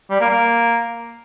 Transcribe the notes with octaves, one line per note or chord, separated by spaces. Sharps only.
G3
A#3
A#3